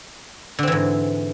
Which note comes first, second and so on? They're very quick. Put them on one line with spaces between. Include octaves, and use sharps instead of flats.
D3 C4 E3 G#2